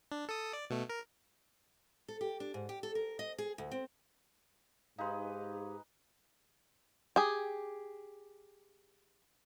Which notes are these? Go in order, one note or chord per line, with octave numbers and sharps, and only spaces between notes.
D4
A4 D#6
D5
B2 A3
A#4
A4
G4
D4
G#2
G4
A4
A#4
D#5
G#4
D2
C4
G#2 D#4 G4 G#4 B4 F5 C6
G4 G#4